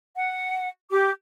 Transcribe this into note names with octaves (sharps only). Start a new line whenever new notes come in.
F#5
G4 D6